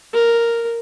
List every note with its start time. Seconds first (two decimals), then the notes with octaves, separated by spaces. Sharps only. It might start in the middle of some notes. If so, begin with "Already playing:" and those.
0.13 A#4